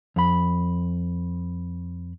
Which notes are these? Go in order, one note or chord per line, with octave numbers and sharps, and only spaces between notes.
F2 B5